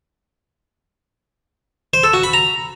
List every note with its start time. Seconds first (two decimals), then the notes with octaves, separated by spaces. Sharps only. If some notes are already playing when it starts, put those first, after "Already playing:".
1.94 C5
2.04 A4
2.14 F#4
2.23 B5
2.33 A#5